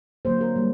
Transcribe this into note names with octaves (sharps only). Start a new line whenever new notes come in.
D3 F#3 A#3 C5
A#4
G3 A#3